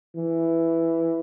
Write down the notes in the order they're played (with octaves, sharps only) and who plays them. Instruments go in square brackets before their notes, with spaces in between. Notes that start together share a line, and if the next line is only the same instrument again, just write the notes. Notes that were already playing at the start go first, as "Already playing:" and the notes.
[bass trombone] E3